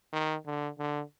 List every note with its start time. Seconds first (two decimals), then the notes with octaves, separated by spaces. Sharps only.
0.13 D#3
0.46 D3
0.79 D3